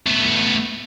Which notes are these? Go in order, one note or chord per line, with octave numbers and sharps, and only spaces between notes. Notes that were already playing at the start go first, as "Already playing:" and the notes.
A3 B3